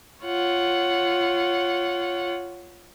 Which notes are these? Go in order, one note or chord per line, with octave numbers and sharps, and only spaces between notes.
F4 C#5 F#5